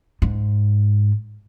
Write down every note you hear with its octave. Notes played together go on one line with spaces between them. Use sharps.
G#2